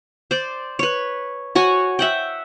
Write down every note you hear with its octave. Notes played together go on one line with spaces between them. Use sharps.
C5 D5
B4 C#5
F#4 C#5 G#5
E5 F#5 G5